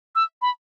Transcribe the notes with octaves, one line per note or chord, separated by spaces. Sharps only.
E6
B5